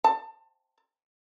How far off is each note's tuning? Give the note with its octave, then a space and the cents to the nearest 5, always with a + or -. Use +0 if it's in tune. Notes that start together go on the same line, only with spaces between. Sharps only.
A5 +30